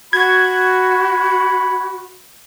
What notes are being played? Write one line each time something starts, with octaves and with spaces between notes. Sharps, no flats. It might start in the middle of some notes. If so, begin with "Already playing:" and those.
F#4 B5 G#6